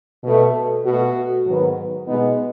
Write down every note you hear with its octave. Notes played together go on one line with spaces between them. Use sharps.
B2 A3
B2 A3 F#4
G#2 D#3 F#3 B3
B2 G#3 B3 D#4